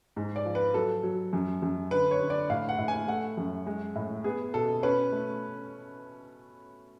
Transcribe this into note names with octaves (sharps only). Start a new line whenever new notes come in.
G#2
D5
F3
B4
F#3 A4
F#3
F#2
F#2
D3 B4
C#5
D3
D5
A2 F5
F#5
A2
G#5
A3 F#5
F#2
G#3
A2
B3 G#4
B2 A4
C#4 B4
A3